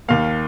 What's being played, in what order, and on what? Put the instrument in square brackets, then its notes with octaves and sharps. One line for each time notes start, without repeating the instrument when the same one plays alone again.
[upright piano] D#2 D#3 A#3 F5